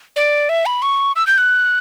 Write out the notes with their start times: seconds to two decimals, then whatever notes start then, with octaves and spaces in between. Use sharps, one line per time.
0.16 D5
0.49 E5
0.66 B5
0.82 C#6
1.16 E6
1.27 G6
1.38 F#6